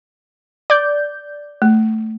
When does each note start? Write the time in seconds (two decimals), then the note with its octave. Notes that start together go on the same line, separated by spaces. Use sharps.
0.70 D5 G6
1.62 A3